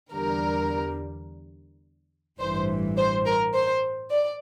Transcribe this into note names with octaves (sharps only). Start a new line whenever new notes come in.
E2 D3 G3 A#4
A1 G2 E3 C5
C5
A#4
C5
D5